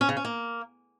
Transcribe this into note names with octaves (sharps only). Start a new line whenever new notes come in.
C#4
C#3
C#4
A#3